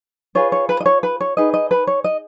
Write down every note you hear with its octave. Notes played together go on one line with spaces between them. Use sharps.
F4 G#4 B4 C#5
C#5
B4
D#5
C#5
B4
C#5
D#4 G#4 B4 D#5
D#5
B4
C#5
D#5